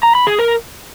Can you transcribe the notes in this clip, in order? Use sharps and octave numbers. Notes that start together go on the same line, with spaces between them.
A#5
B5
G#4
A#4